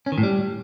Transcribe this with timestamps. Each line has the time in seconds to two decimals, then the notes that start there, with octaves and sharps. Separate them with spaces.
0.06 C#4
0.12 D#3
0.18 A2
0.23 G3